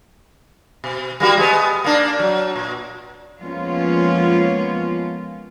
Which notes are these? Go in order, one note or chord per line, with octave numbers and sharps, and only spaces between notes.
B2
G3 A#3 F#4
G#3 B3
A#3 D4
F#3
A#2
F3 G#3 A#3 B3 C#4 F4